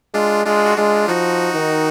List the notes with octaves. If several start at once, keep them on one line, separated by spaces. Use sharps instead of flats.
G#3 D4 F4
G#3 D4 F4
F#4
G#3 D4 F4
F3 D#4 F#4
D#3